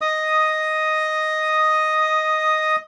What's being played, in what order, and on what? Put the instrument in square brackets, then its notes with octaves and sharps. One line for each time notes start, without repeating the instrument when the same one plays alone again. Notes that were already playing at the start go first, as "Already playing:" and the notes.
[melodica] D#5 D#6